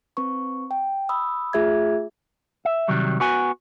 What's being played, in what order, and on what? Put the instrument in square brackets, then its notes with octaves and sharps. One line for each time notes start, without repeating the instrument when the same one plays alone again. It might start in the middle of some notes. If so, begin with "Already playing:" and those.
[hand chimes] C4 B4 C#6
G5
B5 D#6 E6
A3 F4 G#4 E5 D6 G#6
[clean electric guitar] E5
C3 D#3 F#3 G3
B3 F#4 G#5